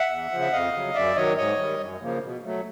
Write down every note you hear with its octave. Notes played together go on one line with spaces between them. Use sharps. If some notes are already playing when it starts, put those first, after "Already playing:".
Already playing: E5 F#5
E2
C#3 F3
E5
F2 D#5 F5
C#3 F#3
F#2 D5 E5
D#3 F#3 C#5 D#5
G#2 C#5 D#5
D#3 G3
F#2
C#3 F3 A#3
B2
F#3 A3